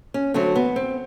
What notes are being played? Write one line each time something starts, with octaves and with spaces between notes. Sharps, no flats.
C#4
D3 F#3 A3 C4
B3
C4